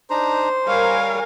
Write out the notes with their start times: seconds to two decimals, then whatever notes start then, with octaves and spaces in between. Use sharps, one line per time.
0.10 D4 D#4 C5 A#5
0.67 G3 A#4 C#5 F5 G#5